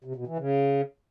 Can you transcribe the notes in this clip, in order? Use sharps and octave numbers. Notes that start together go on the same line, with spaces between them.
C3
B2
E3
C#3